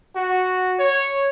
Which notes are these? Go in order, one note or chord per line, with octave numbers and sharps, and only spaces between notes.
F#4
C#5